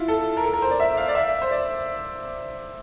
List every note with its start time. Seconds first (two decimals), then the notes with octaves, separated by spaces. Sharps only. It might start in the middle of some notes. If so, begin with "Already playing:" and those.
Already playing: E4 F4
0.08 A4
0.37 A#4
0.44 A4
0.53 A#4
0.62 C5
0.71 D5
0.80 E5
0.97 F5
1.08 D5
1.15 E5
1.42 C5
1.51 D5